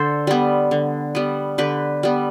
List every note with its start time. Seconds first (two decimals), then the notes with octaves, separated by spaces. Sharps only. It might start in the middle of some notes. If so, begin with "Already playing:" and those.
Already playing: D3 A4 C5
0.27 G3 B3
0.71 D3
1.15 G3 B3
1.58 D3 G4 B4
2.03 G3 B3